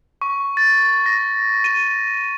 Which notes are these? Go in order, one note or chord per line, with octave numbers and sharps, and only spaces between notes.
C#6
A6
A#6
D#7